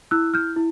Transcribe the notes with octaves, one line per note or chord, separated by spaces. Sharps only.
E4 E6 F#6
F6 G6
E4